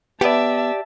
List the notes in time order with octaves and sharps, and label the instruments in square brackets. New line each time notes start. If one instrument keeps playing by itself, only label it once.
[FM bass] B3 [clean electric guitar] G4 D5 [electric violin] E5 A5